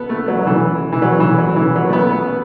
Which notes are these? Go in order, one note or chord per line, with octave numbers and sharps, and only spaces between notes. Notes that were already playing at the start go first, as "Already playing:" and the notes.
Already playing: B3 A4
A3
F#3
F#3
E3
E3
F#3
E3
F#3
E3
F#3
A3
B3